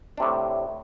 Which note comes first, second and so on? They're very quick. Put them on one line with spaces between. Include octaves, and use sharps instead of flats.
D4 C3 A2